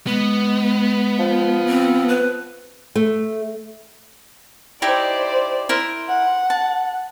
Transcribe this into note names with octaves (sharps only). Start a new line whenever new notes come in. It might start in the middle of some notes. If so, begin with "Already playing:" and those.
G#3 B3
F3
C4
B4
A3
D#4 E4 G4 C5 D5
E4 A#4 C5
F#5
A5